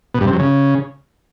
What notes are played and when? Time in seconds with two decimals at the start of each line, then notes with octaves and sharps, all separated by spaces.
0.14 B2
0.21 G2
0.27 C3
0.33 F#2
0.39 C#3